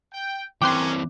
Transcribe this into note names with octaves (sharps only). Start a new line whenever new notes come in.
G5
E3 A#3 C4 C#4 G5 C6 D6 F#6